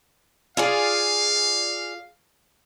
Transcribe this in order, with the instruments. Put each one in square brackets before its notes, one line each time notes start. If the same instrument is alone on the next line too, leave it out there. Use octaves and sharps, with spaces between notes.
[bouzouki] F4 G#4 D5 [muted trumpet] F5